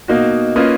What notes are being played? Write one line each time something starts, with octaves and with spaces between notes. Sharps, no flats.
B2 A#3 D#4 F#4
A#3 C#4 F4 B4 D#5